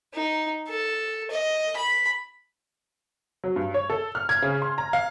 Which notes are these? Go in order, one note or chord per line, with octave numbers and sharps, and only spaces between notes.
D#4
A4
D#5
B5
F#3
G2
C#5
A4
F6
G#6
C#3
C6
A#5
F5